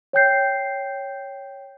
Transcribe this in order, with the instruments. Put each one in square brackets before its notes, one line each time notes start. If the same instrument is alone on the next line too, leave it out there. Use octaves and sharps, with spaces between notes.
[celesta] C#5 G5 G6 C7